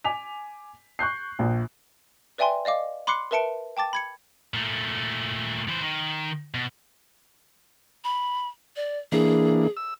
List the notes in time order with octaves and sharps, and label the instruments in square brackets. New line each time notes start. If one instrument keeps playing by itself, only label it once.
[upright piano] G#5 D6 B6 F7
C#6 F#6 G6 C7
A#1 A#2
[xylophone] B4 D5 E5 G5 G#5 C6
D5 D#5 F5 D6
B5 C6 D6 F#6 C7 C#7
A#4 B4 E5 A5 C#7 D7
G5 A5 D6 A6
B5 G#6 C#7
[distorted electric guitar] A#2 A3
E3 C5
D#3
B2
[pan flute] B5
D5
[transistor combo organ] E3 A#3 D4 [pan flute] G#4
[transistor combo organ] E6